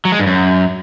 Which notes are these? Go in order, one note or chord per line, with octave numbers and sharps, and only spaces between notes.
F#3
G#3
G2
F#2